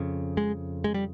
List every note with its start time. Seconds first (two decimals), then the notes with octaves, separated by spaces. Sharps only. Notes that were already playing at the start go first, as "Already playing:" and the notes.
Already playing: F2 C#3
0.37 G#3
0.84 G#3
0.94 G3